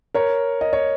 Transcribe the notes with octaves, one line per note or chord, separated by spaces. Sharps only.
A#4 C#5
D#5
C#5